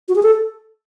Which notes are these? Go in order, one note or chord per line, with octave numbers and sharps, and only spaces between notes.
F#4
G#4
A4